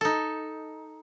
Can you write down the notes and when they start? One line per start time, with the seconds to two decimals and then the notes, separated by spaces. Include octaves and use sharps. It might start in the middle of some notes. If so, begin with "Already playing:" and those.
0.01 D#4 A4